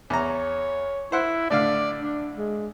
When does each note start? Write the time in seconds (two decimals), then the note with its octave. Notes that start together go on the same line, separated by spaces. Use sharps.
0.10 E2 C#5 A#5
1.12 E4 C5 F#5
1.50 A2 D3 D5 F5
2.00 D4
2.38 G#3